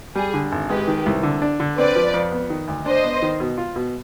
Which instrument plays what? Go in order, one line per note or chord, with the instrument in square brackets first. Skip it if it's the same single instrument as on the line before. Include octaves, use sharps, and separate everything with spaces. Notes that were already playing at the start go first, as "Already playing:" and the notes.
[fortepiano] G3 [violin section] G#4
[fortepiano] D3
G#1
[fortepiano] G#3 [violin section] G4 B4
[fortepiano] D#3
C2
D3
D4
D3
[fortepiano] C4 [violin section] B4 D5
[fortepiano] F3
F2
B3
D#3
D2
[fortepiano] D4 [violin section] C5 D#5
[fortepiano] B3
D#3
B2
F4
B2